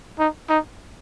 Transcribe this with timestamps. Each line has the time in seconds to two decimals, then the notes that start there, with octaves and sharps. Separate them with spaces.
0.19 D#4
0.49 D#4